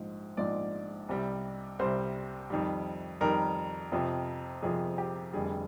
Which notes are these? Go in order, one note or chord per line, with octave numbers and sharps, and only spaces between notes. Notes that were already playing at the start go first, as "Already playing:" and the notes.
Already playing: A#1 G#2 F3
A#1 G#2 F3 D5
C2 C3 G3
C2 C3 G3 C5
F2 D#3 G3
F2 D#3 G3 A#4
F2 C3 F3
F2 C3 F3 G#4
G4
F1 F2 D3 G3 G#4